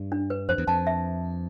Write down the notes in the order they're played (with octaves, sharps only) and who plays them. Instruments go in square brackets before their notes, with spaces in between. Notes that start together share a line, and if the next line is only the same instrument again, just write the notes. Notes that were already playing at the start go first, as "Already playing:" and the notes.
Already playing: [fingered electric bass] G2
[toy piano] D4
B4
[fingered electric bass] F2 [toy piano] C5
[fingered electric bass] E2
[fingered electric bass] F2 [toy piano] A5
[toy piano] E5